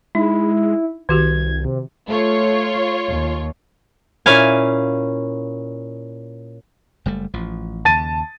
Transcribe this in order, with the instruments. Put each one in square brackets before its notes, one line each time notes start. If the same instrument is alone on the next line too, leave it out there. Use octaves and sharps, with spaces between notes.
[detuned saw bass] G#3 [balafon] D#4 [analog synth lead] E4
[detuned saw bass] C2 [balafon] D#3 F#4 G4 [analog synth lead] G#6
[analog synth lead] C3
[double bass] A3 [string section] F4 C#5
[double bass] D#2
[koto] A#2 C#4 E4 F5 G#5
[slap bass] F#1 G3 A3
A1 F3
[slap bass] D#2 C#3 [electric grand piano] A5 A6 D#7